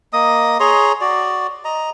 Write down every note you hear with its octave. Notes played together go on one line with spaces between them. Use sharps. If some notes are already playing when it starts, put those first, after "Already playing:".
A#3 D#5 D#6
G#4 C#5 A#5 C6
F#4 D5
D#5 A#5